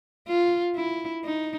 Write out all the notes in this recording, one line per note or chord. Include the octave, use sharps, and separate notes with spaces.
F4
E4
D#4